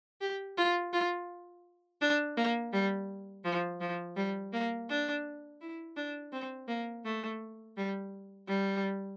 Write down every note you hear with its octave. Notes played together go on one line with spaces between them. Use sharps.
G4
F4
F4
D4
A#3
G3
F3
F3
G3
A#3
D4
E4
D4
C4
A#3
A3
G3
G3